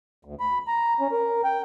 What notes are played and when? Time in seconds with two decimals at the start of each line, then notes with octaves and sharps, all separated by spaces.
0.25 D2
0.40 B5
0.68 A#5
1.00 C#4
1.12 A#4
1.44 G5